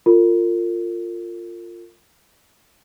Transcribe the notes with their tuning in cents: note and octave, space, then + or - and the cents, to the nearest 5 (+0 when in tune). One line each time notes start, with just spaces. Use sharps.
F4 +0 A#4 -40